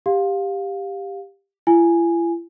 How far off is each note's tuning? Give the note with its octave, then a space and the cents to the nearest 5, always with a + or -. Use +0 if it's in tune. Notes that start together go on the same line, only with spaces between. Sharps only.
G4 +10 F5 +20
E4 +45 G#5 +0